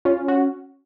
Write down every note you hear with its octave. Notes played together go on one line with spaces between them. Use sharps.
C#4 F4
F#4